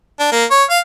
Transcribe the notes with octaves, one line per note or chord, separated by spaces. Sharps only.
D4
A#3
C#5
F5